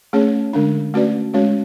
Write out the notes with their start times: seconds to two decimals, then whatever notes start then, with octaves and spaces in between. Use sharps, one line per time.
0.13 A3 C#4 G#4 C#5
0.53 D3 G#3 D4
0.94 A3 C#4 F#4 B4 D5
1.34 G#3 C#4 F#4 C#5